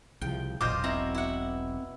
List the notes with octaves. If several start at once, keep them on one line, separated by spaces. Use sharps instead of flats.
C2 C#3 F3 G5
E1 B1 A#2 F4 C5 D#5 D6 G6
B2 C4 E4 A#5
E4 F#5